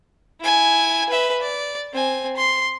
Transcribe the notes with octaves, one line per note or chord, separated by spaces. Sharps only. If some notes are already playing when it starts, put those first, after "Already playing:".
E4 G#5
B4 E5
D5
C4 G#5
C6